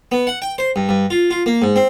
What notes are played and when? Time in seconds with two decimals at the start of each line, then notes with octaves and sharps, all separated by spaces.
0.12 B3
0.27 F#5
0.42 G5
0.58 C5
0.76 G2
0.89 G2
1.10 F4
1.31 F4
1.46 A#3
1.62 G#2
1.76 C4